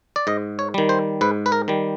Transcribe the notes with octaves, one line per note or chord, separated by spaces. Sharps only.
D5
G#2 D#5
C#5
D#3 G3
C5
G#2 B4
B4
A#4
D#3 G3